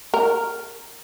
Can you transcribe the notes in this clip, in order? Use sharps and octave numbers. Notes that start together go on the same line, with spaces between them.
A#4